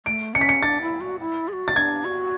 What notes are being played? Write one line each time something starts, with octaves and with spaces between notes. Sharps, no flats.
A3 D7
C#4 C#7
B6
C#7
D4 A6
E4
F#4
E4
G#4
F#4
A6
D4 G#6
F#4